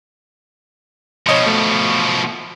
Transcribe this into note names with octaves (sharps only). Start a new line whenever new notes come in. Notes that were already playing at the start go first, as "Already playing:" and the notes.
B2 F3 C#5 D#5 C#7
A3